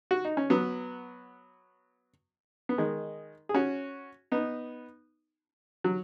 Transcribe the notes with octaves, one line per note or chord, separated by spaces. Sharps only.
F#4
D#4
C#4
F#3 B3
B3
D#3 G#3
G#4
C#4 F#4
B3 D#4
F#3